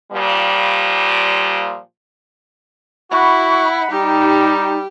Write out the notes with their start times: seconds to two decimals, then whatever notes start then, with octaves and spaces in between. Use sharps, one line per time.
0.12 A#2 F3 G3
3.11 E4 F#4 F#5 B5 C#6
3.91 G3 D#4 G4 A#5